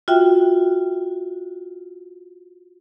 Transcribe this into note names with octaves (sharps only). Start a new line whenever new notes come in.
F4 F#4 E5 G5